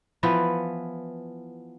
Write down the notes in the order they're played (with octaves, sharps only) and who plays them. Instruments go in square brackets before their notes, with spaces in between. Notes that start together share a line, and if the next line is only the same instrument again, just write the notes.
[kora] E3 F3 B3 B4